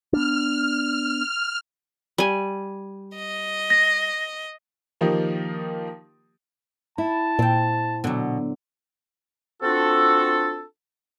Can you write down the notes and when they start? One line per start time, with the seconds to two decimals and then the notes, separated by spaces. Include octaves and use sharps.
0.13 B3 D4 F6
2.18 G3 G#5
3.15 D#5
3.70 A#6
5.01 D#3 F3 A#3 D#4 G4
6.98 E4 A5
7.39 A#2 C4 G5
8.04 B2 D3 F#3
9.62 C4 D4 F4 F#4 A4